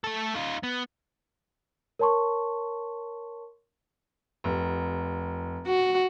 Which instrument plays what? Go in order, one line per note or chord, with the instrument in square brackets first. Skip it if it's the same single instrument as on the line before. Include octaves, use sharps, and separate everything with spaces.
[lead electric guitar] A3 A4
D#4 F4
B3
[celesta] A#4 C#5 A5 C6 C#6
[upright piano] F1
[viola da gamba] F#4